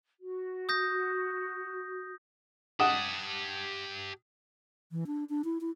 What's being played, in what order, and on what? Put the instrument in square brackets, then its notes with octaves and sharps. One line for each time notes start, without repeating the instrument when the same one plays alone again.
[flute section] F#4
[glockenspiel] D#6 G6 A#6
[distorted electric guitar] G4 A5 [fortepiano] F#5 D#6
[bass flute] E3
D4
D4
E4
E4